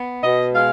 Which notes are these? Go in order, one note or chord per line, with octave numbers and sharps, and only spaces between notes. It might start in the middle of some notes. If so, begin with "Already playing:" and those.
Already playing: B3
B2 D#5
G#3 F5